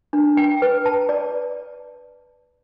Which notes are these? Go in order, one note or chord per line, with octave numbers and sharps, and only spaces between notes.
D4
G5
B4
A5
D5